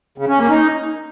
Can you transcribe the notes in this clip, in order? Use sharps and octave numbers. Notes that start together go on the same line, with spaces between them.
C#3
C#4
A#3
D#4